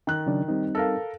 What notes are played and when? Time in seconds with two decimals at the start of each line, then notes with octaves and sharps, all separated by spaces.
0.07 D#3 F#6
0.26 C#3 F#3 D4
0.48 G3 C4 D#4
0.75 A4 A#4 F5